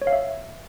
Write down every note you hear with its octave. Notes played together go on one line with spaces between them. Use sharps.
C#5
F5
E5